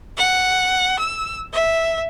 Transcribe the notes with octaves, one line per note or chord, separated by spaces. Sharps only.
F#5
E6
E5